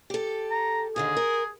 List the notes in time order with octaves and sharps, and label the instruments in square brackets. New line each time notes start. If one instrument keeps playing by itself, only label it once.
[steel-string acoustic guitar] G4 A4
[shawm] A#5
[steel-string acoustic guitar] D#2 D3 D#3 [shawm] G#4
[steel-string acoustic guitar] A#4